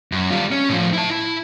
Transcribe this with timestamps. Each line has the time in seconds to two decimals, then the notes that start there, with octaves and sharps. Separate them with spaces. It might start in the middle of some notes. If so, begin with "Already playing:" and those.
0.12 F#2
0.31 G3 F4
0.52 C#4
0.69 A2 F3
0.93 E4 A5
1.11 E4